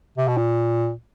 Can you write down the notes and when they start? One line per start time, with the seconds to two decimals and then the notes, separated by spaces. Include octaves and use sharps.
0.18 C3
0.28 B2
0.37 A#2